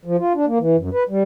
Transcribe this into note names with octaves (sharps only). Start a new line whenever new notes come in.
F3
F4
D4
A#3
E3
F#2
B4
G3